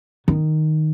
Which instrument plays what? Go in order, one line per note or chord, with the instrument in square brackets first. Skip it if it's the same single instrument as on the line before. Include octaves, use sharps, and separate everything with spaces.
[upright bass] D#3